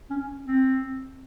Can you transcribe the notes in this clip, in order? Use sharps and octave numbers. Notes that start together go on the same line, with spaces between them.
C#4
C4